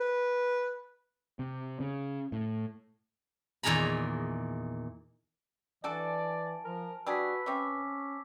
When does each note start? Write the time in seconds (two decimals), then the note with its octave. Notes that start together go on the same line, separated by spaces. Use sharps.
0.01 B4
1.39 C3
1.80 C#3
2.32 A2
3.63 E2 A#2 D#3 G#4 A#5 B5
5.84 E3 D4 F#4 A4 D5 G#5 A5 D7
6.64 F3 A#4
7.06 G3 D4 F#4 G#4 B4 E6 B6
7.46 C4 C#4 C#5 E5 C#6 D6